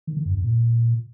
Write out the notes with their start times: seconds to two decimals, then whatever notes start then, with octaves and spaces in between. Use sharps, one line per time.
0.07 D#3
0.17 D3
0.26 F#2
0.35 F2
0.44 A#2